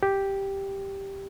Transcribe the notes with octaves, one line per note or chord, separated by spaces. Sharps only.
G4